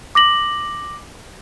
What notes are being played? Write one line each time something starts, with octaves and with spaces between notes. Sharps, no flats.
D6 A#6 F#7